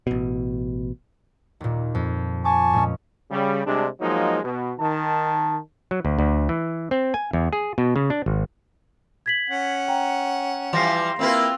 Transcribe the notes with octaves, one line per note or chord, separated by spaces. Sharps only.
A1 B2
D#2 A#2
F2
G#5 A5 C#6 D6
A#2 G#3 C#4
C#3 G3
C3 G3 G#3 D4
F3 F#3 G#3 A#3 D#4
B2
D#3 A5
F#3
D2
D2
E3
C4
G#5
E2
G#4
B2
C#3
D4
G#1
G#6 B6 F#7
C#4 F#5
G5 A#5
E3 F3 G3 C6 A#6 C7
A#3 C4 E4 F4 B4